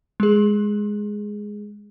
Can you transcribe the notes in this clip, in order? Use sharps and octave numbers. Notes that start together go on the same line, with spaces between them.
G#3 G#4